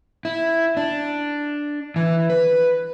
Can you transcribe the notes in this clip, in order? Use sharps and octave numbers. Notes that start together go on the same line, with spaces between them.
E4
D4
E3
B4